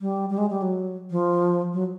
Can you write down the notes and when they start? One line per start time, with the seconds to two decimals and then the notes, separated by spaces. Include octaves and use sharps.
0.01 G3
0.30 G3
0.38 G#3
0.50 G3
0.62 F#3
1.11 F3
1.73 F#3